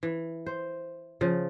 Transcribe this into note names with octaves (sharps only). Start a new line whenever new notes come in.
E3
C5
C#3 F3